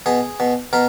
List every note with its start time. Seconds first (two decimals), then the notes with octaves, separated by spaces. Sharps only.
0.06 B2 G#4
0.40 B2
0.73 B2 A#4